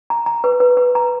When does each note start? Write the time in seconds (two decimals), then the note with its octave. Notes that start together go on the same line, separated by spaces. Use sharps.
0.10 A#5
0.26 A#5
0.44 B4
0.60 B4
0.77 B4
0.95 A#5